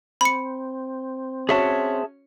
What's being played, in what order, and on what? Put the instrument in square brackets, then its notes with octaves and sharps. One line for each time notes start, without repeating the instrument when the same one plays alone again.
[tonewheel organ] C4 [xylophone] B5 C#7
[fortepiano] C#4 F#4 C#5 [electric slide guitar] G#4 E5 A5